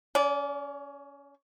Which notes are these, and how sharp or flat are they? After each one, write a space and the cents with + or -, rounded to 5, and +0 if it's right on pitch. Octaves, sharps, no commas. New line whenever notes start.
C#4 +20 D5 -30